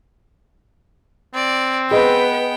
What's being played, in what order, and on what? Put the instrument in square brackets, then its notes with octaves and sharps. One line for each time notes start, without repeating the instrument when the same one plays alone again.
[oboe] C4 [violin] D5
[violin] B3 G5 [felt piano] G#4 D#5 [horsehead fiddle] B4